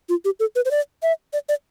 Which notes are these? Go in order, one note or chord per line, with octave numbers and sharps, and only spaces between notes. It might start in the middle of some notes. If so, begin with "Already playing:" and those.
F4
G4
A4
B4
C5
D5
E5
D5
D5